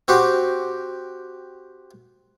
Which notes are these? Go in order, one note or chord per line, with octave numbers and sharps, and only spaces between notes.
C4 F#4 G4